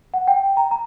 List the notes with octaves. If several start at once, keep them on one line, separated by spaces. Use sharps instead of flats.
F#5
G5
A#5
A#5